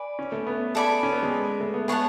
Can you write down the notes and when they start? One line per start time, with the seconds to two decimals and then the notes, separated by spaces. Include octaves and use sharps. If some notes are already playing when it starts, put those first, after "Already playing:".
Already playing: B4 D5 G#5
0.19 C#4
0.32 A3
0.47 B3
0.75 A4 D5 G#5 B5
1.03 C#4
1.13 B3
1.22 G#3
1.60 A3
1.74 B3
1.88 B3 G#4 C#5 F#5 A5